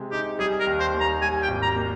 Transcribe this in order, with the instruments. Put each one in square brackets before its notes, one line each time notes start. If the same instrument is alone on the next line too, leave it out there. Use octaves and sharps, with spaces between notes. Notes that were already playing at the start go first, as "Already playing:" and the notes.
Already playing: [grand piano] C3 G#3
[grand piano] D#4 [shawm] G4
[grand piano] G3 [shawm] G#4
[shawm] A#4
[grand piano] D#2
[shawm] C5
[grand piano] D#2
[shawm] A#5
[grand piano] G3 [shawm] G#5
[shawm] G5
[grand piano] G#1
[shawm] A#5
[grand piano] A#3